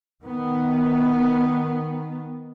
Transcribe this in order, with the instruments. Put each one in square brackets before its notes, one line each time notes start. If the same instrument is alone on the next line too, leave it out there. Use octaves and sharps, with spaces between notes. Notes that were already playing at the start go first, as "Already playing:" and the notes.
[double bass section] D#3 B3